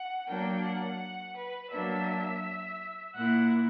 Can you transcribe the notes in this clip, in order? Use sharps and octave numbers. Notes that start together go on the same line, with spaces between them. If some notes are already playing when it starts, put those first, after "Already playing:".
Already playing: F#5
F#3 A#3 D4 G5
F#5
B4
F#3 A#3 D4 E5
A#2 A#3 E4 F#5